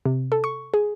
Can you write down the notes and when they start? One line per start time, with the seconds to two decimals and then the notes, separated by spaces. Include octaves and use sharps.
0.05 C3
0.32 A4
0.44 C#6
0.74 G#4